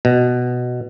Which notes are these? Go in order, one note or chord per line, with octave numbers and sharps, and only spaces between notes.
B2